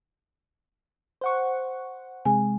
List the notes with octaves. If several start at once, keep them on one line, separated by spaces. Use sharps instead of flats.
C5 F#5 C#6
C3 G#3 G#5